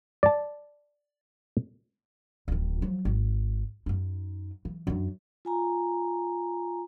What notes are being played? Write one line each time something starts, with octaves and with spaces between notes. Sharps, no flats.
D5 A5
D1 D#3
F3 F#3
G#1
F#2 D#4
E3
F#2 D4
F4 G#5 A#5